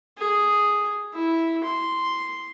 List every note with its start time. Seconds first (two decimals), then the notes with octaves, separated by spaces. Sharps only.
0.19 G#4
1.14 E4
1.64 C6